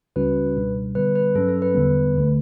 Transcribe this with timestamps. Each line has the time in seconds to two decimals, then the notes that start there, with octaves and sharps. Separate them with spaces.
0.16 C#2 C#3 G3 C#4 F#4 B4
0.56 C#2 B2 G3 D4
0.95 D3 G3 B3 B4
1.15 B4
1.35 G2 F#3 C#4 A4
1.48 A4
1.62 B4
1.74 E2 D3 G3 B3
2.15 D2 D3 A3